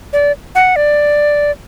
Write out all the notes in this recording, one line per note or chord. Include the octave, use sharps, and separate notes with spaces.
D5
F#5
D5